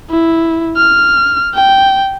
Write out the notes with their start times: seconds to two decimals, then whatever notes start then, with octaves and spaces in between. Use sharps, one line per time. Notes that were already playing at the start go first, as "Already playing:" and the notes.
0.10 E4
0.77 F6
1.54 G5